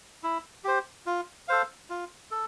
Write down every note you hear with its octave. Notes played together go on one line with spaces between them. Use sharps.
E4
G4 C5
F4
A4 C5 F5
F4
A4